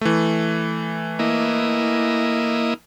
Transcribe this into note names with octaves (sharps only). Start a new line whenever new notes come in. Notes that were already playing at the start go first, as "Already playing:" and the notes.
E3 A3
A#3 E4 D#5